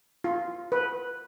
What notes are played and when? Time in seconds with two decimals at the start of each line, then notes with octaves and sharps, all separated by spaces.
0.24 F4
0.72 B4